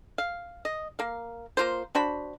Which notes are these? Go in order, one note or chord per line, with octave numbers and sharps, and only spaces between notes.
F5
D#5
A#3 F5
A#3 F4 C5
D4 F#4 C5 B5